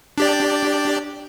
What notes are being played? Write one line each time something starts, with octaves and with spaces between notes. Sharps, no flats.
D4 G4 D5